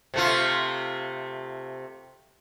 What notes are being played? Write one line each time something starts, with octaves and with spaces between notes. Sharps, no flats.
C3 A3 F4